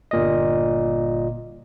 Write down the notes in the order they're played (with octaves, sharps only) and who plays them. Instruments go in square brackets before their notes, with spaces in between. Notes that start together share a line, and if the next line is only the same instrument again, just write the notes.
[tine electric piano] G1 A#2 D#5